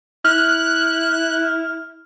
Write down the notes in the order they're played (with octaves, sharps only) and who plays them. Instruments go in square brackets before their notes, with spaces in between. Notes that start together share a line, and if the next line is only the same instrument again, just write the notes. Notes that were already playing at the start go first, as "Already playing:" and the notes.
[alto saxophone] E4 [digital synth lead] F6 [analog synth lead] F#6